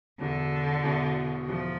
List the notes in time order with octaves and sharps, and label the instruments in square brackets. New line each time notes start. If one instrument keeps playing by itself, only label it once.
[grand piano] E1 E2 B2 [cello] D3
[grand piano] E1 E2 B2
[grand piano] E1 E2 B2 [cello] F3